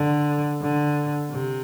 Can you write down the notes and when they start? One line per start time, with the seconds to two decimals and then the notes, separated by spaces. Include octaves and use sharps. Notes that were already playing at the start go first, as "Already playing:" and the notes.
Already playing: D3
0.62 D3
1.31 C3